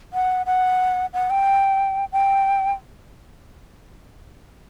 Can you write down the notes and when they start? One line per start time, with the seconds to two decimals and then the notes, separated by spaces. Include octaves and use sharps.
0.13 F#5
0.46 F#5
1.13 F#5
1.30 G5
2.12 G5